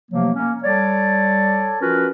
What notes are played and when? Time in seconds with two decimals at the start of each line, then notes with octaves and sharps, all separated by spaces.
0.11 C3 F3 F#3 A3 A#3
0.34 A#3 C#4
0.63 G3 A4 C#5 D5
1.81 F3 C#4 F4 F#4 A#4 B4